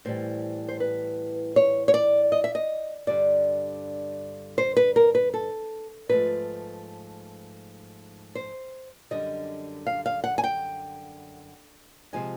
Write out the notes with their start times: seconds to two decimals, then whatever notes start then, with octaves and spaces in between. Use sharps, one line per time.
0.05 A2 E3 G3 C5
0.69 C5
0.80 B4
1.56 C#5
1.88 C#5
1.94 D5
2.32 D#5
2.44 E5
2.55 D#5
3.07 G2 D3 G3 D5
4.58 C5
4.77 B4
4.96 A#4
5.15 B4
5.34 A4
6.09 G#2 F3 A3 B4
8.35 C5
9.11 F#2 D3 G3 D#5
9.87 F5
10.06 F5
10.24 F#5
10.38 G#5
10.44 G5
12.13 C3 F3 G#3 G#5